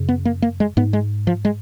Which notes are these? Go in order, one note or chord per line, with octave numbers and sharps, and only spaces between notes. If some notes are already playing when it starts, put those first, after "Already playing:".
Already playing: F#2 C#3
B3
A#3
A#3
G#3
G#2 B3
G#3
F3
G#3